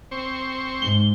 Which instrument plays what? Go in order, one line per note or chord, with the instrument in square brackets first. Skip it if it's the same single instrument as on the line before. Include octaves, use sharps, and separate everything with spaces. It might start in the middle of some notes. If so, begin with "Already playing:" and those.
[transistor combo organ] C4 C5 C#6
[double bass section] G#2 [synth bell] G7